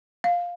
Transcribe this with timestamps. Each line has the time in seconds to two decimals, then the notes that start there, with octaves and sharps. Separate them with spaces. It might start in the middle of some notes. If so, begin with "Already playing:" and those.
0.24 F5